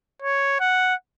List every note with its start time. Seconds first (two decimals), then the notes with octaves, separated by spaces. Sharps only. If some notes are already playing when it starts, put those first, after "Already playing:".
0.22 C#5
0.60 F#5